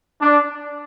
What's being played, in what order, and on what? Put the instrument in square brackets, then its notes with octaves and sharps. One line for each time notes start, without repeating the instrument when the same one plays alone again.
[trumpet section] D4